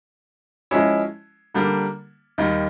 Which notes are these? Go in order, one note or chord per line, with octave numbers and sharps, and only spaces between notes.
F3 G#3 C#4 E4
D3 G3 A#3 D4
D#2 D#3 G3